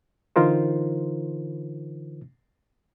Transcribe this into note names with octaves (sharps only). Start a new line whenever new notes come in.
D3 E3 D#4 F4 A#4 C5